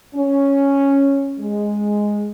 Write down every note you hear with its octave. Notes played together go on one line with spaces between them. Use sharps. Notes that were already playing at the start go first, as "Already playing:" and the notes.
C#4
G#3